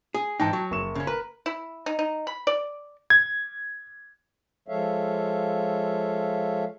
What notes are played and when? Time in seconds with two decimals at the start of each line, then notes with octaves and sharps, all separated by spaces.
0.14 G#4
0.40 G#2 E3 D#4 G5 A5
0.53 F#3
0.71 F#1 C#6 E7
0.95 C#3 C#4
1.07 A#4 B4
1.46 E4
1.86 D#4
1.99 D#4
2.27 B5
2.47 D5
3.10 G#6
4.68 F3 G#3 A4 C#5 E5 F5